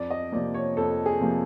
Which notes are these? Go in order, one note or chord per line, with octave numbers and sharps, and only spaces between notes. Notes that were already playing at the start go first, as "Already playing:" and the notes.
Already playing: F2 D5
D#5
C3 F3 A#3 D5
C#5
F2 A4
G#4
C3 F3 A#3